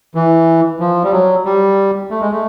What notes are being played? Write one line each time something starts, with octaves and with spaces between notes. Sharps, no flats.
E3
F3
G3
F#3
G3
A3
G#3
A3